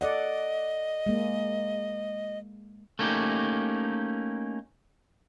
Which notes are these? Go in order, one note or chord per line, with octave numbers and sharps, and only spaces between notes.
A4 D5 D#5 F#5
G#3 A#3
A3 A#3 C#4 D#4 G4